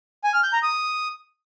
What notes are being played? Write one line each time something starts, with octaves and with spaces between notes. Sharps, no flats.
G#5
F6
G6
A#5
D#6